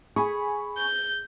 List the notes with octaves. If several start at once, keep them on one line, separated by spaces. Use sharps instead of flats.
G#4 G#5 B5 C#6
G6